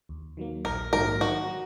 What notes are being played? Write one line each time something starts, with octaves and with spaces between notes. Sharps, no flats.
D#2
D#3 F#3 A#3
A#1 A#4
G#2 D#3 F#3 A#3 A#4
D#3 F#4
F#3